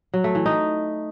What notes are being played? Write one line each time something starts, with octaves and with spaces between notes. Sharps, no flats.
F#3
A3
E3
D#4